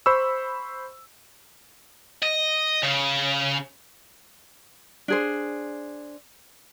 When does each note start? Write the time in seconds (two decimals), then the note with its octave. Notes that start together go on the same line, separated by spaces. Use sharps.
0.06 C5 B5 C#6 E6
2.23 D#5
2.83 C#3
5.08 D4 G#4 C5